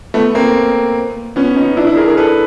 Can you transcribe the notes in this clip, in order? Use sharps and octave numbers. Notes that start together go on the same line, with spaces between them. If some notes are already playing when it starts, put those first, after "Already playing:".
A3 B3
A#3 C4
B3 C#4
C#4 D#4
D4 E4
D4 E4
G#4 A#4
G#4 A#4
A4 B4